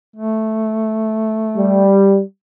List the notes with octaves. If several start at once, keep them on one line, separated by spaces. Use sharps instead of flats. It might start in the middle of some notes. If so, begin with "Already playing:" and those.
A3
G3